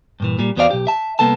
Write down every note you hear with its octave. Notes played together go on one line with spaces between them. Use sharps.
G2 A#2 E3
A#2 G3
E2 B3 F#4 C5 D5 F5
B1 G4
E5 A5
C2 F3 A#3 B3 A4 A5